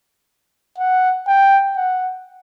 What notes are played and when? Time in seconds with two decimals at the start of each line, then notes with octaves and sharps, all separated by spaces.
0.78 F#5
1.27 G5
1.76 F#5